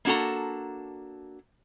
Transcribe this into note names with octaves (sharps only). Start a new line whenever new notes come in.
A#3 D4 F#4 A4 A#5